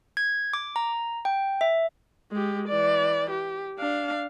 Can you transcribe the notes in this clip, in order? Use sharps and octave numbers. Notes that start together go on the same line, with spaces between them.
G#6
D6
A#5
G5
E5
G#3 G4
E3 D5
G4
D4 F5